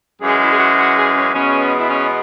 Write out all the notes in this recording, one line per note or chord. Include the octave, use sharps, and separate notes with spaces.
F#2 E3 G#3 G#4
E4
G#4
F#4
F#4
G#4
C#4
E2 B2 G#3 B3 C#4
E4
C#4